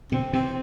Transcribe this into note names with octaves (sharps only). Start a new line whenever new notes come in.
B2 D3 C4
C3 E3 C4